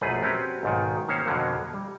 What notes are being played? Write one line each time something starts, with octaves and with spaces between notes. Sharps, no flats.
A#1 F#2 B2 A3 G#4 B4
F#3 C4 C#4 G4 B4
B1 G#2 D#3
D#3 A#3 C#4 C5 C#5
F2 B2 D3 F#3 A#3
G3